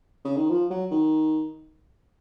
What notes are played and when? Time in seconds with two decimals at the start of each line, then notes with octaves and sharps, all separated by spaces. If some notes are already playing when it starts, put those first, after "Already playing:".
0.25 C#3
0.37 D#3
0.50 F3
0.70 F#3
0.91 D#3